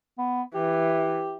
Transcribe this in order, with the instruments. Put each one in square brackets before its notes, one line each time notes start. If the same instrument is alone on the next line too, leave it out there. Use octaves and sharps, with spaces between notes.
[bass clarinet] B3
[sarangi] E3 [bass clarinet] G4